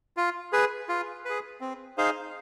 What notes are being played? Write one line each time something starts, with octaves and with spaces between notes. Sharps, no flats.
F4
G#4 B4
F4
G#4 B4
C4
D#4 G#4 C5 F5